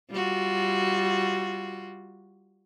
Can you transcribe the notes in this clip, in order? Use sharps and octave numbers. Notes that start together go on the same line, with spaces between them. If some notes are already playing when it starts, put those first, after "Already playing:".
G3 F4 F#4